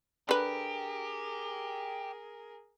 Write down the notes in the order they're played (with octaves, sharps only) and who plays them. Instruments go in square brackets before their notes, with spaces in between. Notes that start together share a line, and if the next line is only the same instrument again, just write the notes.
[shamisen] D3 B4 [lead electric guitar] G4 [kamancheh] G#4 A#4